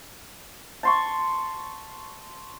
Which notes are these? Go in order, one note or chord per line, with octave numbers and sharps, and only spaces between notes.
A5 C6 C#6